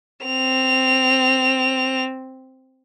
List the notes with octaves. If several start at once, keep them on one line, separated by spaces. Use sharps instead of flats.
C4 F7